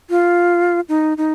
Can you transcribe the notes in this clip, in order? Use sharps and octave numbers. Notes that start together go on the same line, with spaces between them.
F4
D#4
D#4